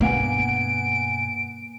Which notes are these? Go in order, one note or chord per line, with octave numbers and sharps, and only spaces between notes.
G2 B2 A#3 B3 F#5 G#5 D7